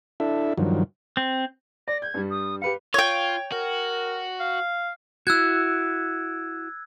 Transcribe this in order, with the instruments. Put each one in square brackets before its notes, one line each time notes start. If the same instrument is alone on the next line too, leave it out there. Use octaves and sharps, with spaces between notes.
[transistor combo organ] D4 E4 A4 E5
G2 D#3 F3 F#3
[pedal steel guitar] C4
[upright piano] D5 [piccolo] A#6
[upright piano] G6 [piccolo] G#6
[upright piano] G2 G3
[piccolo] D#6
[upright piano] G4 B4 F5 [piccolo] C#7
[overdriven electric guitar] F4 [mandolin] C#5 G5
[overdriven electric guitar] F#4 [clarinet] A#4
[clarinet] F5
[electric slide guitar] E4 F#4 [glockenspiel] E6 F#6 G#6